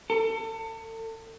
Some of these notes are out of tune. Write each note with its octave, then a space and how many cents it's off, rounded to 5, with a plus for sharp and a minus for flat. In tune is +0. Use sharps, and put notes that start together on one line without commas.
A4 +35